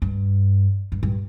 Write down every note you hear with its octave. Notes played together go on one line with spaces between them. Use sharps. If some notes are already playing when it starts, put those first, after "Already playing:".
G2
G2
G2